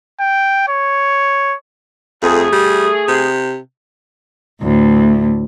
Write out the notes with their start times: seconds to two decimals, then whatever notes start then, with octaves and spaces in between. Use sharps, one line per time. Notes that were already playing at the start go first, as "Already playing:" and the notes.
0.21 G5
0.69 C#5
2.23 F2 A3 G#4
2.53 G3
3.08 C3
4.62 D2 A2